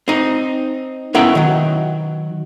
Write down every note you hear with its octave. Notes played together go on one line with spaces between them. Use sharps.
C4 D#4
B3 C#4 E4 A#4 G5 A#5
D#3 F#3